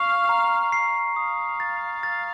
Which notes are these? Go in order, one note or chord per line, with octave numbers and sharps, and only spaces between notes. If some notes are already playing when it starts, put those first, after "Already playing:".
Already playing: F5 C#6
A#5
C7
F5 D#6
A6
A6